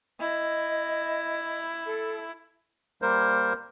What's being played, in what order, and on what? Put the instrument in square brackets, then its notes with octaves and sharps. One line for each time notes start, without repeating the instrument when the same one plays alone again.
[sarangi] E4 [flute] D#5
[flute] A4
[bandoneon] G3 A#3 A#4 C5